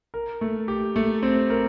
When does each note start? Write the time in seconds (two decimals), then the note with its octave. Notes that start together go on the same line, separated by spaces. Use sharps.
0.14 A#4
0.41 A3
0.68 G4
0.96 A3
1.23 C4
1.50 A#4